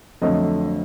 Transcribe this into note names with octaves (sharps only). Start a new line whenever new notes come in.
F2 D3 F#3 A3 D#5